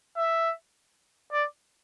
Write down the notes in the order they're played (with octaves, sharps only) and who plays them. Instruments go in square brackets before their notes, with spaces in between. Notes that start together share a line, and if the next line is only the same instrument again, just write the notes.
[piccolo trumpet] E5
D5